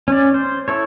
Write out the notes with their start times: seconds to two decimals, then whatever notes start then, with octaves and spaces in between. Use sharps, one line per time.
0.08 C#4 D5
0.34 C5
0.68 E4 A4 C#5